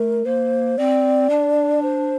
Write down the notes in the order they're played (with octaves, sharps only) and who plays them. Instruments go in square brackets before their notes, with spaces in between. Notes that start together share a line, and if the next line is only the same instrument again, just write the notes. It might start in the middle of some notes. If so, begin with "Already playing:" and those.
Already playing: [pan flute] A3 [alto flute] A#4
[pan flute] A#3 [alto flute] C5
[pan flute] C4 [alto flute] D5
[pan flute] D4
[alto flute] C5